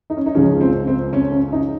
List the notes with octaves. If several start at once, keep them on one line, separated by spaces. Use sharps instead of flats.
D#4
C#4
D#4
C#2 C#3 F3 C#4
C4
C4
C#4
C#4
D#4